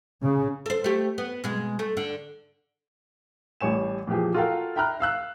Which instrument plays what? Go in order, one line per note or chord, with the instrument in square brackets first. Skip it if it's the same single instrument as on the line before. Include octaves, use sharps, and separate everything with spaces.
[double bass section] C#3
[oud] A4 C5
A3 G4
B3
B2 G#3
A3
D3
[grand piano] A1 E3 G3 C#5 G#5 E7
A#2 E3 F3 G4 G#4
F4 F#4 A4 A#4 F5 G5
E5 G5 A#5 B5 F6 F#6
F5 E6 F#6